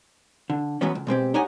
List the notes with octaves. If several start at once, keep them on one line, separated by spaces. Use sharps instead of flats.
D3
E3 F#3 G#3 B3 C#4
C#2
B2 G#3 C4 G4
D#4 G4 C#5 D#5 F#5 G#5